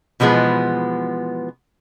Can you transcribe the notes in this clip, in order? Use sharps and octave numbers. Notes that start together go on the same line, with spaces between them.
B2 E3 F3 G#3 B3